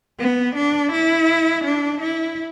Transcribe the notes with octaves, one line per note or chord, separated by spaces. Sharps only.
B3
D4
E4
D4
E4